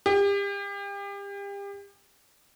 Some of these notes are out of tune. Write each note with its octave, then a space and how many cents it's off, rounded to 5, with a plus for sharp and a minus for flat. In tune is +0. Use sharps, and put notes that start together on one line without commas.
G4 +35